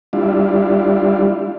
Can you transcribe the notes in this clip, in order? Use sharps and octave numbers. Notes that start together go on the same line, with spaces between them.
G3 D4 E4 F4